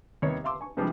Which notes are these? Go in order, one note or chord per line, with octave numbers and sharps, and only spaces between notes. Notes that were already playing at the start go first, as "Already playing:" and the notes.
D#2 C3 G3 B3 C#5
E5 F5 C6 D6 E6
G#5 C#6
C3 E3 F3 G3 G#3 D4